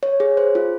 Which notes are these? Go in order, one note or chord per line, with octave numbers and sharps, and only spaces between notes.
C#5
G#4
C5
F4